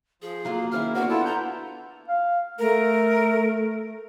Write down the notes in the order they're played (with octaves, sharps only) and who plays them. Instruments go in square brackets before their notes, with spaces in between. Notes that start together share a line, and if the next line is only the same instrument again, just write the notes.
[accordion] F3 [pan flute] G#4
[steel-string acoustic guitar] F#3 F4 A4 [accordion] A#3
[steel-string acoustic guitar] D#3 C#4 E4 [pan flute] F6
[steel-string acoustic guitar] B3 D4 D5 [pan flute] F#4 [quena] F#5
[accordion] E4 F4 A4 [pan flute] A5
[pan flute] A#5 [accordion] G6
[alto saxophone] F5
[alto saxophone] A3 [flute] A#4